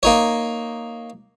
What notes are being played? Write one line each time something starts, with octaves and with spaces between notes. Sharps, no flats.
A#3 D#4 C#5